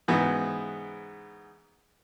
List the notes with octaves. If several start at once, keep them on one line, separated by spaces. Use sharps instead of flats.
G#2 C#3 E3 B3 F#4